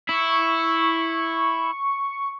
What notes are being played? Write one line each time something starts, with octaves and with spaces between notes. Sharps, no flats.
E4 C#6